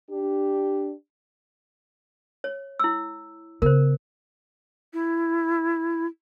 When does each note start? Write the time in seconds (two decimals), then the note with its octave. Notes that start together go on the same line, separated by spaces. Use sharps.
0.10 D4 G4
2.44 C#5
2.79 E4 E6
3.62 C#3 B3 A#4 C5
4.93 E4